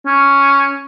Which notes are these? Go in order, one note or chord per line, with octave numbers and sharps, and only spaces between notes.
C#4